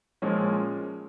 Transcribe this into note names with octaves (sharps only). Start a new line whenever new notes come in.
A#2 F3 G#3 C#4